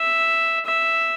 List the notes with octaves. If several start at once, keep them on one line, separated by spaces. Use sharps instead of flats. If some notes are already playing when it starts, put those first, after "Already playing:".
Already playing: E5
E5